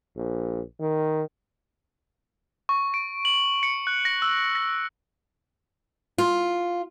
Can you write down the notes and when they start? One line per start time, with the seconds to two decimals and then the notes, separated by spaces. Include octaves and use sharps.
0.17 A#1
0.80 D#3
2.69 C#6
2.94 D7
3.25 F#7
3.63 C#7
3.87 F#6
4.05 A#6
4.22 E6
4.55 A#6
6.18 F4